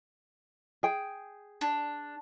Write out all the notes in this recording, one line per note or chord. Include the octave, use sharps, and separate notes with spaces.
G#4 G5
D4